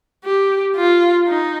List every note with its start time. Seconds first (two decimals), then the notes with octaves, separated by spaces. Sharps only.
0.25 G4
0.76 F4
1.28 D#4